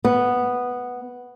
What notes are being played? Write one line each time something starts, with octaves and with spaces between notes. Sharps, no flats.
B3